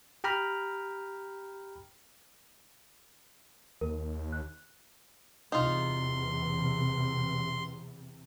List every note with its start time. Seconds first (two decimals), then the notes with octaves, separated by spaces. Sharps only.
0.24 G4 G5 A#5 B5 F6
3.81 D#2 A#4
4.33 F#6
5.52 E2 C3 D#4 F4 C6